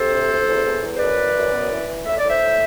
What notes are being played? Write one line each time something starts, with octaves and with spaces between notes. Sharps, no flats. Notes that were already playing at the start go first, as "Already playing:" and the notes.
Already playing: C3 A4 C5
D2
D2
E2
E2
E2
C5
F#2 B4 D5
E3
F#2
B3
E3
E3
A2 E5
D5
A2 C5 E5
A2